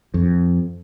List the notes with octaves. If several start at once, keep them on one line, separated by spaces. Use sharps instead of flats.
F2